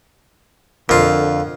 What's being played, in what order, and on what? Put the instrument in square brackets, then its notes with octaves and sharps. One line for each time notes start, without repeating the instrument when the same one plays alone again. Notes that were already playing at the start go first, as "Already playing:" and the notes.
[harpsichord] F2 F4 [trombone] D3 [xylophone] A#4